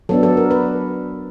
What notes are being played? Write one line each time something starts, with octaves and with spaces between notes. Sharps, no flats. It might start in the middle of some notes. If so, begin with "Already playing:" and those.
F#3 B3 D4 A4
A4
A#4
B4